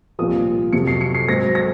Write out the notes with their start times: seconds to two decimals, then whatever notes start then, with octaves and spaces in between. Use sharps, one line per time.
0.19 C2 A#2 F3 D#6
0.73 F2 C3 F#3 C#7
0.87 C7
1.01 C#7
1.15 C7
1.28 G#2 F#3 C4 A#6
1.55 A#6